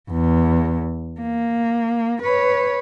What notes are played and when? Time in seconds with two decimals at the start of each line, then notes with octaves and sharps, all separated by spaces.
0.11 E2
1.20 A#3
2.22 B4 C#5